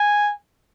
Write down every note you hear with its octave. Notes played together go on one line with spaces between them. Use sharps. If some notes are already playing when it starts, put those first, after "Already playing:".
Already playing: G#5